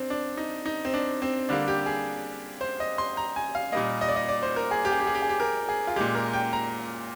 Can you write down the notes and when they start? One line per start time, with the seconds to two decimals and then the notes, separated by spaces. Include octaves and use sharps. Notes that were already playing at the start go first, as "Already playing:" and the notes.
Already playing: C4 D4
0.10 D4
0.37 D#4
0.66 D#4
0.85 C4
0.94 D4
1.22 C4
1.49 D3 G3 A#3 D4
1.68 G4
1.86 G#4
2.61 C5
2.80 D#5
2.98 C6
3.17 A#5
3.36 G#5
3.55 F5
3.72 A#2 G3 A#3 D#5
4.01 D#5
4.08 D5
4.16 D#5
4.29 D5
4.43 C5
4.56 A#4
4.71 G#4
4.85 G4
4.92 G#4
5.00 G4
5.07 G#4
5.15 G4
5.22 G#4
5.29 G4
5.40 A#4
5.69 G#4
5.87 F4
5.96 A#2 G#3 G4
6.15 A#4
6.33 G5
6.53 A#5